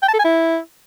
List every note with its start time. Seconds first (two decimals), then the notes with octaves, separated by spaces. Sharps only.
0.02 G5
0.08 A5
0.13 A4
0.19 G#5
0.25 E4